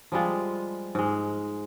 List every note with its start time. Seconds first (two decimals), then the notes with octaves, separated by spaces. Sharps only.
0.12 F3 G3 G#3 F4
0.95 G#2 G#3